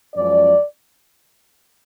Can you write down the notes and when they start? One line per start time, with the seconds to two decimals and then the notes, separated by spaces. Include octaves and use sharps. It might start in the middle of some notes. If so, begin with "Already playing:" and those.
0.15 F#2 F3 G#3 C#4 D5